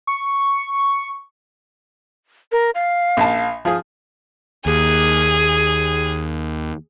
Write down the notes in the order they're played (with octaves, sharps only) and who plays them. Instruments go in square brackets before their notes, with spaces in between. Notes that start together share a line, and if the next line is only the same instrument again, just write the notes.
[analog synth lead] C#6
[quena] A#4
F5
[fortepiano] A#1 A5
F3 F4 G#4
[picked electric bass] D#2 [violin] G#4